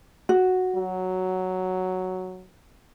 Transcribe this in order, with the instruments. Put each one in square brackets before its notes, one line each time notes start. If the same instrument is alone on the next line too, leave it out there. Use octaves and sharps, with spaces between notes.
[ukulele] F#4
[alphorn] F#3